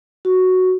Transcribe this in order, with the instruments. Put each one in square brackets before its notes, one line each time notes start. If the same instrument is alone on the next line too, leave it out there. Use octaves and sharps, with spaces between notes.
[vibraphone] F#4